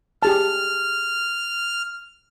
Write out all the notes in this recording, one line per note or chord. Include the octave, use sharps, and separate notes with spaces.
G4 G#4 A5 F6